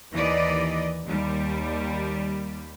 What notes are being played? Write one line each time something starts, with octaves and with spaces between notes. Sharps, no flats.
D#2 E3 D5 D#5
D#2 G3